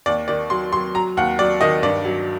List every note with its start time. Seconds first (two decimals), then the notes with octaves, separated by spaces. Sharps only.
0.06 D#2 D5
0.28 D#3 D5
0.50 F#3 C6
0.72 F#3 C6
0.95 F#3 A#5
1.17 D#2 F#5
1.39 F#3 D5
1.61 D#3 D#5
1.83 G2 D5
2.05 F#3